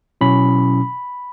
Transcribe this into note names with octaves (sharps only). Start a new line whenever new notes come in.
B2 F#3 C#4 E4 B5